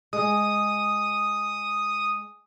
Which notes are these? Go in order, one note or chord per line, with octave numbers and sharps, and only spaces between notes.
G#3 D#6